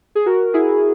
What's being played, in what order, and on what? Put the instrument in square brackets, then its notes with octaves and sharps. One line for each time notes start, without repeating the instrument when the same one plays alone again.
[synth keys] G#4
F#4 A#4
E4 G#4